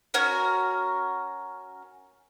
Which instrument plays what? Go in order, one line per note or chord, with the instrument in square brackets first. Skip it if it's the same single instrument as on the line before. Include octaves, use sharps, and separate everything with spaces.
[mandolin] C#4 F#4 A#4